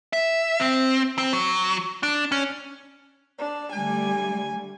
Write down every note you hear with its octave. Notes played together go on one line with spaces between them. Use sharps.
E5
C4
C4
F#3
D4
C#4
D4
D3 G3 A3 G#5